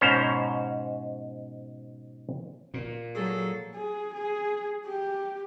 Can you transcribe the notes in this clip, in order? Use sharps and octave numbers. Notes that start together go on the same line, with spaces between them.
G#2 B2 C#4 C5 A#5
A#2
F#3 G#4 A4
G#4
G#4
G4